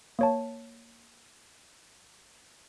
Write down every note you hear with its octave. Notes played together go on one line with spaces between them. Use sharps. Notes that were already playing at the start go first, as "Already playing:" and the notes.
A#3 C#5 A5